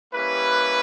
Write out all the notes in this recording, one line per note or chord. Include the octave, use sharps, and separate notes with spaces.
G3 A#3 C#4 E4 G4 B4